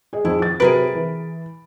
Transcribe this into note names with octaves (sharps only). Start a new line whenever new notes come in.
G#4 D#5
F2 D#3 E4 G#4
A6
C3 F#3 G#4 A#4 B4 D7
E3